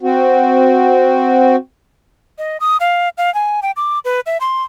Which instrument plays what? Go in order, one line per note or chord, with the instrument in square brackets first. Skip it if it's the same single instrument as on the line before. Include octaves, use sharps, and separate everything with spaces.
[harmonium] C4 F#4
[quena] D#5
D#6
F5
F5
G#5
G5
D6
B4
E5
C6